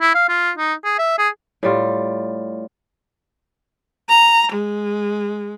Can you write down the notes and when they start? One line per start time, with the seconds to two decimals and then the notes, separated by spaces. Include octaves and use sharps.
0.01 E4
0.15 F5
0.29 F4
0.58 D#4
0.85 G#4
0.99 E5
1.18 G#4
1.63 A2 G3 F4
4.09 A#5
4.52 G#3